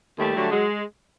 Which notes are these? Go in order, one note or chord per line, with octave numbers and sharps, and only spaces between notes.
D#2 G3 A3
D3 F#3
F#3 G#3